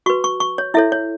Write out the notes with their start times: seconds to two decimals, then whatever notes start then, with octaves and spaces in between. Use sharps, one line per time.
0.06 F#4 B4 C#6
0.24 C#6
0.40 C#6
0.58 C#5
0.74 E4 A4 C#5 E5
0.92 C#5